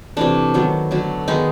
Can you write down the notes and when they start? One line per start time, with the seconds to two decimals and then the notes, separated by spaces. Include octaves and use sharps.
0.17 C3 E3 A3 D4
0.54 D#3 F#3 B3
0.91 D3 F#3 A3
1.28 D#3 G#3 B3 D#4